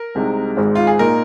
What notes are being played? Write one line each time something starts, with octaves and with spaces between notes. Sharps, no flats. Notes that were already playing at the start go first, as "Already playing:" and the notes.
Already playing: A#4
C2 C3 G#3 D#4
G#1 G#2 G#3
F4
G#4
A#2 A#3 D#4 A#4